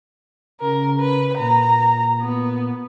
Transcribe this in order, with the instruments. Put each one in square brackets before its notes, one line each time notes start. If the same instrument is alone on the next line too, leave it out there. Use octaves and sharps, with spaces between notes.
[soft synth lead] C#3 [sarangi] A#4
[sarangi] B4
[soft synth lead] A#2 [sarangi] A#5
[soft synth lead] A#2 [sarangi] B3